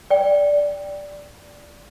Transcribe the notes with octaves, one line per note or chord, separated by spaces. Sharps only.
D5 G5